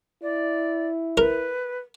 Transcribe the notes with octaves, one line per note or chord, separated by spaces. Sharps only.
E4 D5
A#4 B4